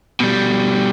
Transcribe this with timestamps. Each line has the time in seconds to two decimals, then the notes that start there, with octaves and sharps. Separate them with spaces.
0.20 B2 G3